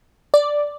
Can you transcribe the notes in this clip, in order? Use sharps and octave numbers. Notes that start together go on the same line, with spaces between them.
D5